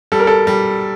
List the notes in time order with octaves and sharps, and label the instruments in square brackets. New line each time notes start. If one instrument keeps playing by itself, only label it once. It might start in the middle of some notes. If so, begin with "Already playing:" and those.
[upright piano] G3 [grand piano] A4
[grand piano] A#4
A4
[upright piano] G3